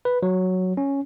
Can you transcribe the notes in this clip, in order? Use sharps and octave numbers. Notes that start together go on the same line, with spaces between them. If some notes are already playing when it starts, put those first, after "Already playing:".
B4
F#3
C#4